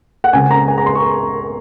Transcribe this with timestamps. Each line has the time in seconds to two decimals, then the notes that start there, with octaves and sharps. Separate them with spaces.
0.24 F#5
0.33 C#2 C#3 G#3 C4 G#5
0.51 A#5
0.68 G#5
0.78 A#5
0.86 C6
0.95 C#6